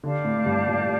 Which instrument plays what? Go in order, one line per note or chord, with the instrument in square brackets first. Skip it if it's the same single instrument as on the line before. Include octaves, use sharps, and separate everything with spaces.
[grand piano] D3 [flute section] G4 D5 F5 A5
[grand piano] A2
G2
A#2
A2